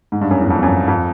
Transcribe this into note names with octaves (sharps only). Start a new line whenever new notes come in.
G#2
G2
F#2
E2
F2
F#2
F2